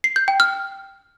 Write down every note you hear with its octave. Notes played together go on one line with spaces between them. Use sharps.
C7
G6
G5
F6